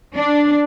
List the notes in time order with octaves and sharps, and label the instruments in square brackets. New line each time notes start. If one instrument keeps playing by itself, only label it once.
[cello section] D4